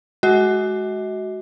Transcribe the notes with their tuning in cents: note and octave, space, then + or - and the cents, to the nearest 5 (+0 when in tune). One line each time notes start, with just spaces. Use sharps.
G#3 +25 F#4 +15 D#5 +45